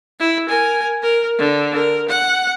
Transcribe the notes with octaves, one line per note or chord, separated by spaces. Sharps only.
E4
A#4 G#5
A#4
D3
A#4
F#5